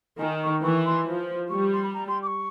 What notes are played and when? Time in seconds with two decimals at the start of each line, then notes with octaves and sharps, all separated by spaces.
0.19 D#3 G#5
0.42 C#6
0.63 E3 C#6
0.86 C6
1.07 F3
1.50 G3 C#6
1.73 C6
1.83 B5
1.94 A#5
2.08 C6
2.22 D6
2.27 C#6